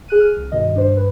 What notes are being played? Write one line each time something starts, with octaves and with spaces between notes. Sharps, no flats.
G#4 F#6 D#7
F6
C2
G2 B2 D#3 D#5
G2 D4 C5
G2 B4